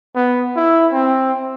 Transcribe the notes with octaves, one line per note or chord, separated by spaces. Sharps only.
B3
E4
C4